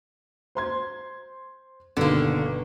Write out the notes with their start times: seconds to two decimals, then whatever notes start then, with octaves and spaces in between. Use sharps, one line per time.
0.55 C5 C6 G#6
1.97 G1 B2 D3 D#3 A#3